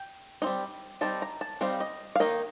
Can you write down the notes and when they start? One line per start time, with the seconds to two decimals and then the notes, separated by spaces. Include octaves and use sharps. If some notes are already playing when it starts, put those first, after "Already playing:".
Already playing: G5
0.42 G3 C4 D#4
1.01 G3 C4 D#4 A5
1.22 A#5
1.41 A5
1.61 G3 C4 D#4 F5
1.80 D#5
2.16 F5
2.20 D#3 A#3 D#4 D#5